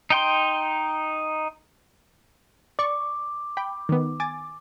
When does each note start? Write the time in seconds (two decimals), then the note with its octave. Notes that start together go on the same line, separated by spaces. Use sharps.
0.10 D#4 G5 C6
2.79 D5 C#6 D6
3.57 G5 B5
3.89 D#3 B3
4.20 G#5 D6 A6